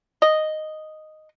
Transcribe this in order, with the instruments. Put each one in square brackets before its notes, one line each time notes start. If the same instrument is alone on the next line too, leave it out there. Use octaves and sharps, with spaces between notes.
[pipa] D#5